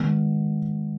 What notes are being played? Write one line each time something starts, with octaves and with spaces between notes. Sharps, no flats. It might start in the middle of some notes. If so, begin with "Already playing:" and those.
Already playing: D#3 G#3 B3